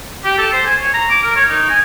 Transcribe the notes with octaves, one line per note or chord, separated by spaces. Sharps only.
G4
A4
C5
G#5
C#5
A#5
D6
A#4
C#5
D#4
G#5